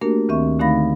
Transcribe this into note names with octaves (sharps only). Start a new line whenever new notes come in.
A3 A#3 D4 F#4 G4 A#4
D2 D#3 C4 E5 C#6
D3 A3 D#4 F5 B5 A#6